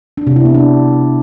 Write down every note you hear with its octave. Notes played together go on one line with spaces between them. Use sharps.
D4
C3
E4
B3
D4